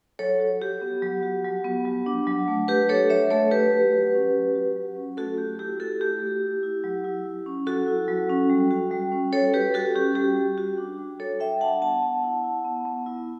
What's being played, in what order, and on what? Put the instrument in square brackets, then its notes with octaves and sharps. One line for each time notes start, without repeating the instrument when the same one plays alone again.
[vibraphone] F#3 A4 C#5
F#4
F#3 G4
B3
F#3
F#4
F#3
B3
F#3
D4
F#3
A3
F#3 G4 B4
D4 A4 C#5
F#3 C#5 E5
A3 A4 C#5
F#3 G4 B4
F#4
F#3
C#4
F#3
F#4
F#3
C#4
A3 F#4 A4
A3 G4
E4 G4
E4 F#4 A4
A3 G4
A3
E4
E4
F#3
E4
F#3
C#4
F#3 F#4 A4
E4
F#3
C#4
G3
F#4
G3
C#4
G3 A4 C#5
F#4 G4 B4
G3 F#4 A4
C#4 G4
G3 G4
F#4
G3 F#4
D4
G3
F#4 A4 C#5
G3 E5 G5
D4 F#5 A5
B3 F#5 A5
B3
E4
E4
B3
B3
E4